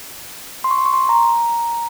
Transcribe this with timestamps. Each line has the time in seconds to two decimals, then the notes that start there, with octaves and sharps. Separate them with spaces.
0.64 C6
0.71 C#6
0.78 C6
0.86 C#6
0.93 C6
1.09 A#5